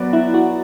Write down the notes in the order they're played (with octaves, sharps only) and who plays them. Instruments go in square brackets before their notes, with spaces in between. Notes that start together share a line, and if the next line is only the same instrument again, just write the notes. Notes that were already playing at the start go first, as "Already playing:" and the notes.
Already playing: [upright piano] F#3 B3 F#4 D5
[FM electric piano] E4
F#4